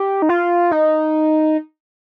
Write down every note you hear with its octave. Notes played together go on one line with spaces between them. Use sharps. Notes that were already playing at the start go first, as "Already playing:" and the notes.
Already playing: G4
D#4
F4
D#4